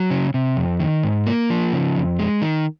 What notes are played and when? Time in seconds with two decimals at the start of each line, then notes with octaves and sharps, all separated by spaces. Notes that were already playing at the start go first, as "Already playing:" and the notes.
Already playing: F#3
0.10 C#3
0.34 C3
0.57 F2
0.80 D#3
1.03 G#2
1.26 A#3
1.50 F3
1.73 C#3
1.96 F2
2.19 G#3
2.42 D#3